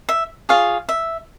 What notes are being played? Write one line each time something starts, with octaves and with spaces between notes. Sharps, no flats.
E5
F4 G#4 C#5 F5
E5